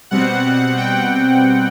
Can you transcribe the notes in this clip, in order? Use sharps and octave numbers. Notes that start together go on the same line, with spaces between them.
B2 G3 C4 F#5
G5